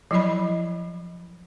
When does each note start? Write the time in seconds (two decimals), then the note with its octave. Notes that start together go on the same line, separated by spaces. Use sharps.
0.11 F3 F#3 E4 D5 D#5 B5